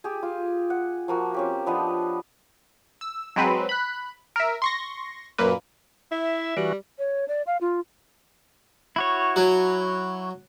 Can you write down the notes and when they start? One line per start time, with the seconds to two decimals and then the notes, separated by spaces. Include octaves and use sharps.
0.04 G4 G#4
0.23 F4
0.70 F#5
1.08 F3 A#3 F#4
1.34 C4 C#4 G4
1.66 F3 B3 D4 D#5
3.01 E6
3.36 F#3 G#3 C4 B4
3.69 B5 F#6
4.36 A#4 E5
4.62 C6 C#6 A#6
5.38 F#2 A#2 A#3 B4
6.12 E4 E5
6.57 E3 G3 F#4
6.99 C#5
7.28 D5
7.47 F5
7.61 F4
8.96 E4 F#4 C#5
9.36 F#3